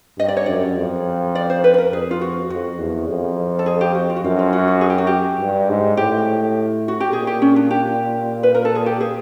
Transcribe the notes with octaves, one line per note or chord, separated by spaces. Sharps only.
G2 D#5
D5
C#5
F#2 D5
F2
D5
C5
B4
B4
A#4
F2 G#4
F4
F#4
F2 F#4
E2
F2
A4
G#4
G4
F#4
F4
F#4
F#2 F4
F4
F#4
F#4
G#4
G4
F#4
G4
G2
G#2
A2 G4
F#4
G4
A#2 G#4
G4
C#4
D4
G4
B4
A#4
A4
G#4
G4
G#4